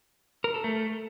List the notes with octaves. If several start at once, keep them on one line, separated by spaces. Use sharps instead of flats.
A#4
A4
A3